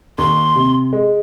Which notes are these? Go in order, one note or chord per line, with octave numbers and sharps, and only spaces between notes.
D#2 C6
C3
G#3